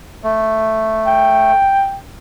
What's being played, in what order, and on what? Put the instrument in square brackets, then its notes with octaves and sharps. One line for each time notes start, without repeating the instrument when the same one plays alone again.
[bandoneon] A3
[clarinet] G5